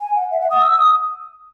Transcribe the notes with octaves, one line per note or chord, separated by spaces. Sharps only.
G#5
F#5
E5
F#5
D#6
E6
D#6